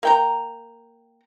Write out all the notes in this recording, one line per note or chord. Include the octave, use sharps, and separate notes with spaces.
A#3 G5 A#5